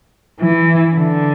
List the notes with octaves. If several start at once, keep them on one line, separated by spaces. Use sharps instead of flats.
E3
D3